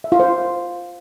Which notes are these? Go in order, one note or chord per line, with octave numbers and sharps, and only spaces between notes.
E5
F4
C5